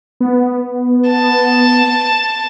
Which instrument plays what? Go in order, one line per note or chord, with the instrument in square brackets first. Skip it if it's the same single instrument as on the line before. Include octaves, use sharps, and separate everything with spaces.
[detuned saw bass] B3
[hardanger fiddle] A5